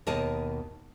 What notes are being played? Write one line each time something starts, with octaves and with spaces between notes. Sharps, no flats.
D#2 B2 A#4 D#5 A5